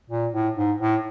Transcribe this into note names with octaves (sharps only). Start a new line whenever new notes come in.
A#2
A2
G#2
A2